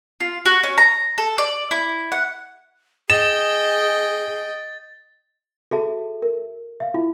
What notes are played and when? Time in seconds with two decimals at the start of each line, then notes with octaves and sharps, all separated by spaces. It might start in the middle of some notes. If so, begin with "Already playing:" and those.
0.20 F4
0.46 F#4
0.63 C#4
0.78 A#5
1.18 A4
1.38 D5
1.71 E4
2.12 F#5
3.10 G#4 D#5 G5 A6 E7
5.71 F#4 G#4 A4 E5 A5
6.22 A#4
6.80 E5 F5
6.94 E4 F4